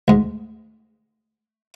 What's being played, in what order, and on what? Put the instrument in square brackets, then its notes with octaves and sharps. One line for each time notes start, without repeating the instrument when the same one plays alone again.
[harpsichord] D2 G#2